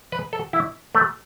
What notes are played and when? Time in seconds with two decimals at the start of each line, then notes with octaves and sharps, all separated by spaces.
0.12 B4
0.33 A4
0.53 E4
0.95 A3